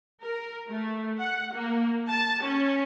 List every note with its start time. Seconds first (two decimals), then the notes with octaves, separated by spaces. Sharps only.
0.23 A#4
0.69 A3
1.20 F#5
1.54 A#3
2.10 A5
2.43 C#4